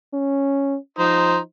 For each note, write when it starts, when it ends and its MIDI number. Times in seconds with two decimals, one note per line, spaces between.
0.14 0.77 61
0.99 1.40 53
0.99 1.36 63
0.99 1.36 72